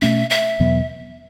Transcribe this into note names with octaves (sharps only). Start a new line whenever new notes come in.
B2 A3 C#4 E5
E5
E2 B2 F#3 B3